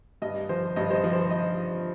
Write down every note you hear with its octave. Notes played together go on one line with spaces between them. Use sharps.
G2 D#5
F3 C5
G2 D#5
C5
D#5
F3
C5
D#5